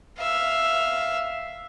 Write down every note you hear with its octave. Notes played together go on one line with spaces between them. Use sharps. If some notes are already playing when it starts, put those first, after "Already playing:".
E5 F5